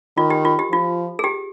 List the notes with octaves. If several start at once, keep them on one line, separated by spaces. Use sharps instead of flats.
D#3 F4
G4
F4
G4
F3 F4
G#4
G4